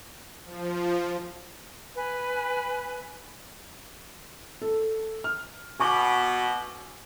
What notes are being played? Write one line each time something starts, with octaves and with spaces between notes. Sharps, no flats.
F3
B4 G#5
A4
F6
B2 G#5 C#6 D6